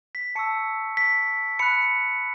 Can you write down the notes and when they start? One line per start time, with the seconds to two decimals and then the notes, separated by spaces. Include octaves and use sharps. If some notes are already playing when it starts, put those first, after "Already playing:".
0.15 B6
0.35 A5 C#6 E6 C#7
0.97 B6
1.59 B5 F#6 C#7